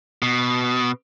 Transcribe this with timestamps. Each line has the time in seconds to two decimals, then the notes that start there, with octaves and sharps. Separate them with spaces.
0.22 B2